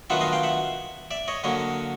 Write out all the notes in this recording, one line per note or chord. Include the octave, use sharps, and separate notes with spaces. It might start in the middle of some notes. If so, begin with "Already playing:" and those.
D#3 F#3 B3 D4 F4 E5 F#5
D#5 F5
F5 G5
E5 F#5
D5 E5
C#5 D#5
D3 F#3 A#3 C#5 D#5